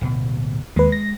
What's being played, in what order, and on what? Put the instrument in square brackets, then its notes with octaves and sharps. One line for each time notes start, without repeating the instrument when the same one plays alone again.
[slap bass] D1 B2
[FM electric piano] D#2 B4 [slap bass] G#3
[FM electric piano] A#6